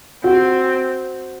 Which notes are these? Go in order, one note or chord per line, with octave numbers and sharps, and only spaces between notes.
C4 F#4